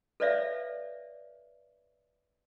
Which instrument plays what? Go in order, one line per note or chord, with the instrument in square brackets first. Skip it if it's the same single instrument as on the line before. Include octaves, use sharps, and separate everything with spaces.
[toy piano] A4 B4 C#5 D5 E5 F5